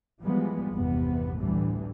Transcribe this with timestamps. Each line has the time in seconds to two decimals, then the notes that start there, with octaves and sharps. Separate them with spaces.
0.22 E3 F3 G3 G#3 B3
0.72 G1 E2 C3 B3
1.40 A1 D2 A2 D3 E3 G3